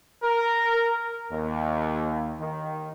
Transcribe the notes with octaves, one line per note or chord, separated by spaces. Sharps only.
A#4
D#2
D#3